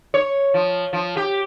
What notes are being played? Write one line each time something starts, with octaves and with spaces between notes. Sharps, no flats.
C#5
F3
F3
G4